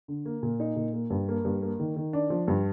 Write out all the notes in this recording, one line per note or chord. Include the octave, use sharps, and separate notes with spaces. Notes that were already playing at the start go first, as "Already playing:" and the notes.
D3
A#3
A#2
D#4
A#2
A#3
G2
A#3
G2
A#3
D#3
D#3
D4
F3
G2